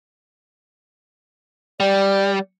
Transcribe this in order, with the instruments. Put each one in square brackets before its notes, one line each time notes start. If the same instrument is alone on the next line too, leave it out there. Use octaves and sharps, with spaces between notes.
[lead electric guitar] G3 [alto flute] D5